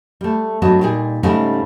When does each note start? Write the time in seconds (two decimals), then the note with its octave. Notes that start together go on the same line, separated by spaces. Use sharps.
0.21 G3 A3
0.62 G2 F#3 B3 F#4 D#5 A5
0.81 A#2 G3 D#4 G#4
1.23 G#2 C#3 G3 A3 C#4 D#4